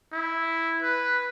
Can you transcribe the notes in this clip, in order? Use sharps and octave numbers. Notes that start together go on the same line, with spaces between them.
E4
B4